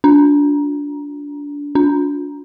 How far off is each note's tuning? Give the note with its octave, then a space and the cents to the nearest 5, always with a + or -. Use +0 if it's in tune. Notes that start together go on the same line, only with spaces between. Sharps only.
D4 -20
D4 -30